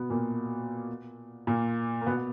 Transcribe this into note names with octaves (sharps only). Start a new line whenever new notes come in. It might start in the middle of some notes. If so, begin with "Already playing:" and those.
Already playing: B2 B3
A#2 A#3
A#2 A#3
A#3
B2 B3